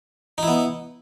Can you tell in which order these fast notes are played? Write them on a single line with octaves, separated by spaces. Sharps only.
D#4 E4 B3